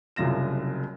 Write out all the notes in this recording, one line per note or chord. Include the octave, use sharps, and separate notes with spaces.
F#1 C2 F#2 F4 A#6 E7